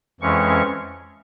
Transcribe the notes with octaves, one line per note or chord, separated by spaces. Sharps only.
F2 E3 G#3 C#4 C#6